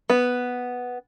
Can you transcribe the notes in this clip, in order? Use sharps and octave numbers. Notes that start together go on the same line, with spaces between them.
B3